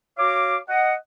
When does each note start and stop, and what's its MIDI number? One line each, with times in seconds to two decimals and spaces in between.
0.18 0.57 66
0.18 0.57 73
0.18 0.57 77
0.18 0.57 86
0.69 0.94 75
0.69 0.94 78